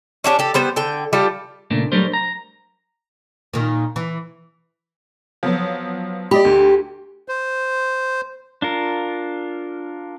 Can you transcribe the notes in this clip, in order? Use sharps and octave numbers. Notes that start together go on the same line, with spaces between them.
C#4 D4 F#4 G4
G4 A4
G3 B3 C5
D3 G5
G3 F4 G4 A4
A#2 C#3 A3 A#3 D4
F#3 G3 A3 D4 A#4 C5
A#5
A#2 D#3
E3
F3 F#3 B3
G4 D5 D#5 B5
D2
C5
D4 F4 A#4